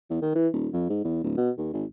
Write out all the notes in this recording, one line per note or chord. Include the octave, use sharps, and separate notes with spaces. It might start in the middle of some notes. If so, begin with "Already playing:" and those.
E2
D#3
E3
D#1
F2
G#2
E2
D1
B2
D#2
G#1